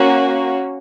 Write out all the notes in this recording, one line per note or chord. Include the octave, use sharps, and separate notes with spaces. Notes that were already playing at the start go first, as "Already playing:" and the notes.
Already playing: A#3 C#4 F#4